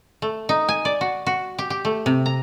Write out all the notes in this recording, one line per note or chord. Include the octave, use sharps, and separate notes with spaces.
A3
D#4
G#5
D5
F#4
F#4
G4
G4
A3
C3
A#5